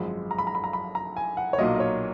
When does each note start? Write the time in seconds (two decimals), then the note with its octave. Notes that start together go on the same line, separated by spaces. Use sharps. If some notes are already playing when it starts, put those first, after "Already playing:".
Already playing: G#1 F#2 F3 G#3 B5
0.31 A#5
0.39 B5
0.47 A#5
0.55 B5
0.64 A#5
0.73 B5
0.95 A#5
1.17 G#5
1.37 F#5
1.53 C#5
1.58 B1 A#2 F#3 A#3 D#5
1.75 D#5
1.80 C#5